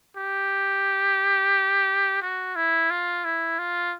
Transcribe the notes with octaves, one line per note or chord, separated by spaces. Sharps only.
G4
F#4
E4
F4
E4
F4